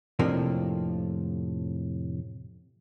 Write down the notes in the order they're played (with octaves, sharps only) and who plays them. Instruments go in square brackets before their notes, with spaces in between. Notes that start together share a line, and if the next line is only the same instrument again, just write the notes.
[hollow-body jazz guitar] F2 A2 C3 F3 A#3 D4